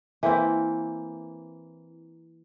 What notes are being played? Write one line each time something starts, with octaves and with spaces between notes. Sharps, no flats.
E3 A#3 C4 E4